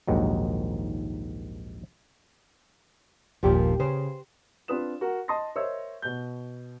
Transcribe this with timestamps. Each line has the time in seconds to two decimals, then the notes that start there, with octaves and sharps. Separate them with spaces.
0.08 A#1 D#2 G#2 D#3 F#3
3.43 G1 D#2 A#2 F3 G4
3.80 C#3 C5
4.68 C4 D4 F4 B4 D#6 E7
5.01 F#4 A#4
5.28 D#5 A5 C6 D#6 A#6
5.55 A#4 C5 C#5 D#5 E5 E6
6.02 B2 G6